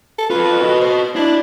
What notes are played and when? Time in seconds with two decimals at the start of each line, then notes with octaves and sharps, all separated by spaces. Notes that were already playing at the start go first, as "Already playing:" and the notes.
0.18 A4
0.30 F4 A4 B4
0.62 F#4 D#5
0.81 C5
1.16 D4 E4